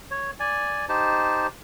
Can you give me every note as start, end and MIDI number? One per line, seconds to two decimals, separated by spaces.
0.11 0.31 73
0.40 0.86 74
0.40 0.86 80
0.89 1.47 63
0.89 1.47 67
0.89 1.47 72
0.89 1.47 81